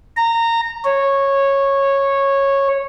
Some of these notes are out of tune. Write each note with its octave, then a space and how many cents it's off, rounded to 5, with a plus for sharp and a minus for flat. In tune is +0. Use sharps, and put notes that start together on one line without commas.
A#5 -20
C#5 -10